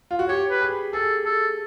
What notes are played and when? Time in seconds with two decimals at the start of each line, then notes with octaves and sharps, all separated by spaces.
0.11 F4
0.19 F#4
0.29 G4 C#5
0.50 B4
0.61 G#4
0.93 G#4 A4
1.25 A4